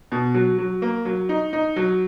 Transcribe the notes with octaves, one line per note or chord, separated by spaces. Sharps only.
B2
F#3
F#3
A#3
F#3
D#4
D#4
F#3